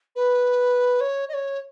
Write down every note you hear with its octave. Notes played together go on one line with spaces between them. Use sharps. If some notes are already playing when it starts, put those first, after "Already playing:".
B4
C#5
D#5
C#5